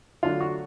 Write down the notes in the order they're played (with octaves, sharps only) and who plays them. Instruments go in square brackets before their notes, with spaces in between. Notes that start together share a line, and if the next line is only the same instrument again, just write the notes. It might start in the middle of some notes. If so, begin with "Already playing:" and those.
[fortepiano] D3 F#3 A3 D4 F4
F#4